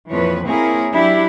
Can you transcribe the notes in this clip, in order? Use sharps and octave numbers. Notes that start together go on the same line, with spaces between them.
F2 A#2 E3 F3 B4 C#5
A#3 C4 E4 G#4 A#4 C#5
F#3 D4 E4 G4